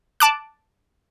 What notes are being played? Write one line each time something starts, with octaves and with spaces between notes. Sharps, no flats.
A5 D6 F#6